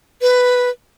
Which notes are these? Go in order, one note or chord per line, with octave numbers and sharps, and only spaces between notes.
B4